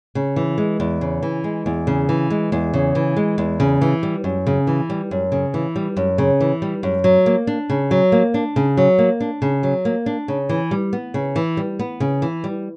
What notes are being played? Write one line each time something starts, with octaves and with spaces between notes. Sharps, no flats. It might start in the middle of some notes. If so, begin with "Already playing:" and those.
C#3
E3
G#3
E2
C#3
E3
G#3
E2
C#3
E3
G#3
E2
C#3
E3
G#3
E2
C#3
E3
G3
F#2
C#3
E3
G3
F#2
C#3
E3
G3
F#2
C#3
E3
G3
F#2
F#3
A#3
D4
C#3
F#3
A#3
D4
C#3
F#3
A#3
D4
C#3
F#3
A#3
D4
C#3
E3
G3
B3
C#3
E3
G3
B3
C#3
E3
G3